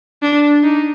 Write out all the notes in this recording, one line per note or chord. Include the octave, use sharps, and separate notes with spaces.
D4
D#4